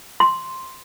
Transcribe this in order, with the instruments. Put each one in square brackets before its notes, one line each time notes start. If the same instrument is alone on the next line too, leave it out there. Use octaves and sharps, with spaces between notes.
[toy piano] C6